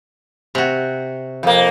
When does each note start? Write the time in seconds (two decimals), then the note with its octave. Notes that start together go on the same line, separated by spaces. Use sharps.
0.55 C3 F#4
1.43 F2 A#3